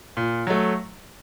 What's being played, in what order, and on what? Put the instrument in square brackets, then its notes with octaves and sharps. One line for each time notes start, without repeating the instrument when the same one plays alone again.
[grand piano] A#2
F#3 A3